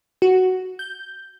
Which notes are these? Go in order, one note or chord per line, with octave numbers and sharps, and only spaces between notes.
F#4
G6